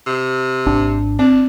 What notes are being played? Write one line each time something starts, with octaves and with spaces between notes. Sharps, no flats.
C3
G#1 D4
C4 D4